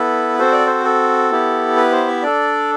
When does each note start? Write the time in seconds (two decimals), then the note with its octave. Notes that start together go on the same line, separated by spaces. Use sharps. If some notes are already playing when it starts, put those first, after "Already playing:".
Already playing: B3 E4 A4 B4
0.39 C4 F#4 A4 C5
0.52 D5
0.67 C5
0.85 A4
1.32 B3 E4 G4
1.76 B4
1.92 C5
2.07 E5
2.22 D4 A4 D5